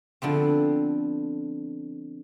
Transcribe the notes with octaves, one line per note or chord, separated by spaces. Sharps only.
D3 F3 B3 C4